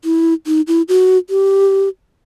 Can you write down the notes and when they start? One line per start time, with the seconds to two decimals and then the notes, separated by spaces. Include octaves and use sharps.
0.04 E4
0.47 D#4
0.67 E4
0.89 F#4
1.30 G4